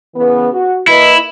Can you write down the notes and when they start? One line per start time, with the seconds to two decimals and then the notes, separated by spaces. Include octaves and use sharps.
0.15 C#3 E3 B3
0.52 F#4
0.88 A#3 E4 B4 D#5